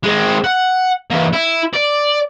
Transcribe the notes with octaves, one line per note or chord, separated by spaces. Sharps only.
G#3 C4
F#5
E3 A#3
E4
D5